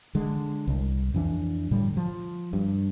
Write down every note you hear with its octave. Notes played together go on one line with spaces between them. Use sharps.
D3 G#3
C2
F2 E3 D4
A2 D3 G3
F3
G2